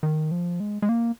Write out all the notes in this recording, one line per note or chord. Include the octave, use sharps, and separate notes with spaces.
D#3
F3
G#3
G#3
A#3